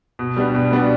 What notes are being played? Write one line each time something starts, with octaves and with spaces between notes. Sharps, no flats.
B2
G3 B3 D4
B2
G3 B3 D4